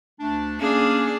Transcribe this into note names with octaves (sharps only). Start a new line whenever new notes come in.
D2 A3 D4
A#3 C#4 D4 G#4